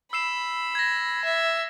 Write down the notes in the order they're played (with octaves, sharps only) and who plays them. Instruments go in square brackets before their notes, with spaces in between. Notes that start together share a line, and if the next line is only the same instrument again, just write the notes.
[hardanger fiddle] B5 [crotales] E6 C7 E7
[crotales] G#6 A#6
[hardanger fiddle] E5